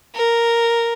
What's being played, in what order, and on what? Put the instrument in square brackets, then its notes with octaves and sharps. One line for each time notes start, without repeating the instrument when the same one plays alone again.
[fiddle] A#4